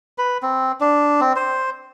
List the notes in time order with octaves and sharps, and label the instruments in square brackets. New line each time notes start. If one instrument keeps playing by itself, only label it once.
[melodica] B4
C4
D4
C4
C5